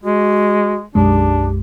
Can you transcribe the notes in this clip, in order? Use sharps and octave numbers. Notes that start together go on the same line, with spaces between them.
G#3 F#4
B1 F#2 G#3 D4 G4